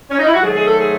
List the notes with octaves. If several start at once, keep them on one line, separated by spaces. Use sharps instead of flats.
C#4
D#4
E4
F#4
G#2 D#3 F#3 A3 G#4
G#4
A4
G#4